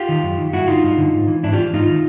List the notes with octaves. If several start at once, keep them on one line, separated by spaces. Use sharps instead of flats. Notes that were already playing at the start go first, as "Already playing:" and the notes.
Already playing: F4 G4
D#3
F#2
D#3
G2 E4 F#4
D3 D#4 F4
G2
D3
G#2
E3
G#2 D4 E4
F4 G4
E3
G#2 D#4 F4
D#3